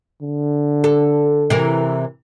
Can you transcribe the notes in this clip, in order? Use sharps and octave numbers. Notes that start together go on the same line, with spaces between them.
D3
A4
C3 E3 A#4